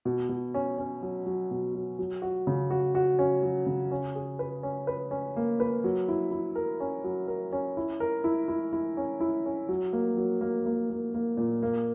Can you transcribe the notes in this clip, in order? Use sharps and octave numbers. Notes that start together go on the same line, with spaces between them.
B2
B2
C#4
C#4
F#3
F#3
B2
F#3
F#3
F#4
C#3
F#4
F#4
C#4
F#3
C#3
C#4
G#4
B4
C#4
B4
C#4
A#3
B4
F#3
E4
E4
A#4
C#4
F#3
A#4
C#4
E4
A#4
E4
E4
E4
C#4
E4
C#4
F#3
A#3
F#3
A#3
A#3
A#3
A#3
A#2
A#3